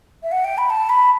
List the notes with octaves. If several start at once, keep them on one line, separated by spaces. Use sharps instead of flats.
E5
F#5
G5
B5
A5
B5